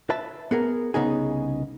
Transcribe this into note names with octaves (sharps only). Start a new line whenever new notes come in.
B4 E5 A5
B3 G#4 A#4
C2 F#2 C#3 B3 D#4 G#4